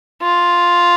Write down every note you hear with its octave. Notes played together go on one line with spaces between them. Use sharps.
F4